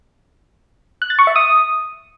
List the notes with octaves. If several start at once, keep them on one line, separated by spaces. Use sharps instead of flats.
F#6
A6
C#6
E5
D#6